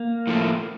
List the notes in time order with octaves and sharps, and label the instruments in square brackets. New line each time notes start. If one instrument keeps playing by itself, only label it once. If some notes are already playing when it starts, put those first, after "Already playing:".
Already playing: [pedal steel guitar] A#3
[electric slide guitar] A2 F3 A3